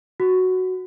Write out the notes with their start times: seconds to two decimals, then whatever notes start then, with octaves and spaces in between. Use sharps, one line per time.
0.20 F#4